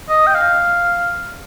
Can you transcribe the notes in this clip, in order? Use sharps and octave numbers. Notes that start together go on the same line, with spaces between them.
D#5
G5
F5